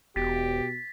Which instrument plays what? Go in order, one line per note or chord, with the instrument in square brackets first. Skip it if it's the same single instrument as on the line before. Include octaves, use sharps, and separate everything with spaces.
[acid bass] E1 [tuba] B2 [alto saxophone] G4 [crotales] A6 B6